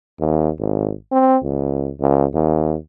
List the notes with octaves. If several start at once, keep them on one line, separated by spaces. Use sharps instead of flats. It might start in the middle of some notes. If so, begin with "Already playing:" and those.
D#2
G#1
C4
C#2
C#2
D#2